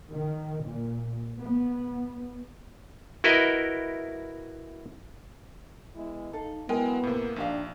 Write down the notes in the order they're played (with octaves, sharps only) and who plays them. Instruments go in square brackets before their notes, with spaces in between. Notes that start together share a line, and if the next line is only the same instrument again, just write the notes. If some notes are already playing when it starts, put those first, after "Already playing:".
[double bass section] D#3
A#2
B3
[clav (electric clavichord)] E4 F#4 A#4 B4 D#5 E5
[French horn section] G#3 B3 E4
[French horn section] D#4 [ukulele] A4 F5
[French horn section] F#3 E4 [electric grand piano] G#3 [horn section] B3 [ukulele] A#4 G5 G#5
[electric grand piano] A2 C3 [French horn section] A#3
[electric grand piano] A#1 [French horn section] D4 [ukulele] D#4 G4 F5